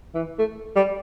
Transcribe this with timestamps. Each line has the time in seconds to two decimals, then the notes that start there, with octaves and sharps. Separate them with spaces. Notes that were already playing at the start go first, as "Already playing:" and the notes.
0.15 E3
0.39 A3
0.76 G3